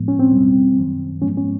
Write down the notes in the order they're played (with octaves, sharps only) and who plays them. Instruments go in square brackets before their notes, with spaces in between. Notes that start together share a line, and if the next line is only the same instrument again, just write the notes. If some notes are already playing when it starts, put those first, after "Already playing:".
Already playing: [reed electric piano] A2 F3 G#3 B3
C#4
C4
E2 B2 G3
F#2 D#3 F#3
G#2 F3 G#3 B3 C#4
C#4